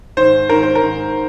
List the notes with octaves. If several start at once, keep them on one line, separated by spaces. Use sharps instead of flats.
G#2 D#3 C5
G#2 D#3 A#4
C5
A#4
G#2 D#3